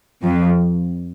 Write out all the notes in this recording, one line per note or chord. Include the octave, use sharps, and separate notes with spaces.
F2